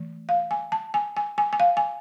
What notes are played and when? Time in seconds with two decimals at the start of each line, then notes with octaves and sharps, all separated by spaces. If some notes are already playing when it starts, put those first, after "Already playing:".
Already playing: E3 A3
0.29 F5
0.51 G#5
0.72 A5
0.94 G#5
1.17 G#5
1.38 G#5
1.53 G#5
1.60 F5
1.77 G#5